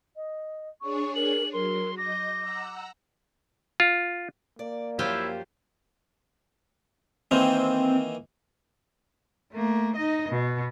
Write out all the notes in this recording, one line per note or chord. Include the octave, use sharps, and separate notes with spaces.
D#5
D4 G#4 C#5 C#6
A#4 F#7
F#3 A#4 C6
D#5 D6 G6 A#6
F#5 A#5 E6
F4
A#3 D5
F#2 F3 F#3 E4 F4 G4 C5
D#3 E3 A#3 C4
A3 A#3
D#4 D#5
B2